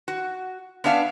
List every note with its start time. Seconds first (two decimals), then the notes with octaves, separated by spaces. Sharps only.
0.08 F#4
0.84 B3 C#4 D4 E5 F5